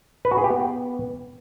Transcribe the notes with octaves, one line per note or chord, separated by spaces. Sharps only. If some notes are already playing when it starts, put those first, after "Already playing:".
B4
F#4
G#4
G4
B3